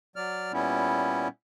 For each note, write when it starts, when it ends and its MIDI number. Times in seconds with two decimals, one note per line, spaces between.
0.16 0.52 54
0.16 0.52 74
0.16 0.52 89
0.53 1.28 46
0.53 1.28 55
0.53 1.28 59
0.53 1.28 61
0.53 1.28 64